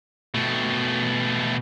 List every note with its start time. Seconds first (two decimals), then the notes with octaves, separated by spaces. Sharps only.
0.34 B2 A3